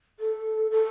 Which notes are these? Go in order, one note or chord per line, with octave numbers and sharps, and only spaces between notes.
A4
A4